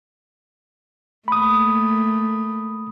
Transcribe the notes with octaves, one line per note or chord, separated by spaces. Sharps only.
A3 A#3 B5 D#6